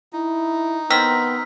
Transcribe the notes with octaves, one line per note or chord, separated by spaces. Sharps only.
D#4 E4
D#3 B3 C4 E6 F6 B6